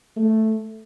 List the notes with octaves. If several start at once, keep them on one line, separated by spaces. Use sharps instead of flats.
A3